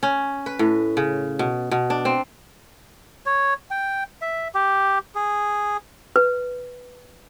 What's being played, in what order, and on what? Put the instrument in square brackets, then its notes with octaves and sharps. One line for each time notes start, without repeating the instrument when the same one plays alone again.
[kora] C#4
B4
A2
C#3
B2
B2
D4
C4
[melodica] C#5
G5
E5
G4
G#4
[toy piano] B4